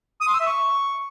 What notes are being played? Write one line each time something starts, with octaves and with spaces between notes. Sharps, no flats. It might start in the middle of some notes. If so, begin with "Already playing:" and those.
D#6
C6
E6
E5
C#6